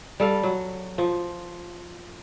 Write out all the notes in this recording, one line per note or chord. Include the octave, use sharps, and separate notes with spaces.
G3 A4 F5
F#3
F3